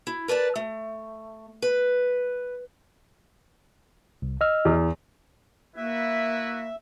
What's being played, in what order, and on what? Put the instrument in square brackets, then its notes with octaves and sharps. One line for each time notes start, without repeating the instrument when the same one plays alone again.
[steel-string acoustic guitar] E4
A#4 B4 D5 A5
A3
B4
[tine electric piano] C2
D#5 E6 F6
[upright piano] E2
[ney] A#3 [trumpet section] E4 F#4 B4 [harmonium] E5